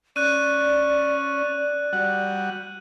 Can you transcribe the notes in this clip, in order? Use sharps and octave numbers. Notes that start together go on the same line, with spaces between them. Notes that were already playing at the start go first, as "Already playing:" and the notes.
C#4 D5 F#6 D#7
G3 F#4 F#5